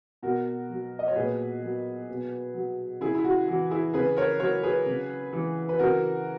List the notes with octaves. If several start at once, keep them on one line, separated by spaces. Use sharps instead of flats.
B2 F#4 A#4
F#3
D#5
C#5
A#2 G#4 B4
F#3
B2
F#3
C#3 E4 G#4
E4
F#4
E3 F#4
E4 G#4
C#3 G#4 B4
A#4 C#5
F#3 A#4 C#5
G#4 B4
C#3
E3
B4
C#3 F#4 A#4